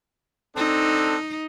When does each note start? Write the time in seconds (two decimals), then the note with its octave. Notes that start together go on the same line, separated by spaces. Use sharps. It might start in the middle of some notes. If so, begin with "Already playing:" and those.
0.57 C4 D4 D#4 A4